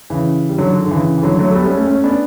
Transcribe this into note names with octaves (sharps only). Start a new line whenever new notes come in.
C#3 E3
G3
D3 F#3
D3
D3
C#3 E3
E3
D3 F#3
F#3 A3
A3
G3 B3
A3 C#4
A3 C#4
A3 C#4
B3 D4